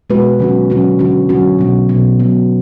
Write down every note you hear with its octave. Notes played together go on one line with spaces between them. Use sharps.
B2 G#3 B3 F#4 B4
D3 F#3 C#4 F#4
D3 F#3 C#4 F#4
D3 F#3 C#4 F#4
D3 F#3 C#4 F#4
B2 F#3 B3
B2 F#3 B3
B2 F#3 B3